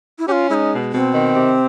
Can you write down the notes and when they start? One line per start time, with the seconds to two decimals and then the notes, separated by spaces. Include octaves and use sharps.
0.19 E4
0.28 C#4 F4 G4
0.50 G#3 D#4 E4
0.71 B2
0.92 B2 C4
1.14 D#3
1.36 C3